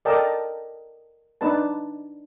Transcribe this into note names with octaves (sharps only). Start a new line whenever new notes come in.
A4 A#4 D5 D#5 G5 A5
D4 D#4 B4 A5